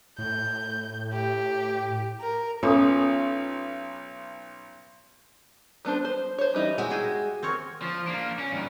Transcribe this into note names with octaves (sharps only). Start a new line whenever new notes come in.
A2 G6
G4
A#4
B1 C#4 F4 A4 D#6
G3 B3 D4 C5
C5
C5 C#5
E3 G3 D#4 E4
G#3 F#4 G4 E5 A#5
G4 G#4 E5
C4 A#4 C#5
F3
A#3 D4
C#4
G2 D#3